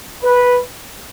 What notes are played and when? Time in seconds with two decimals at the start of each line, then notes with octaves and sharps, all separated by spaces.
0.23 B4